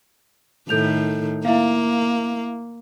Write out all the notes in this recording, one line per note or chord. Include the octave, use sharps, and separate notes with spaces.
A2 D#3 A4 G6 F7
A#3 E4 E5 F5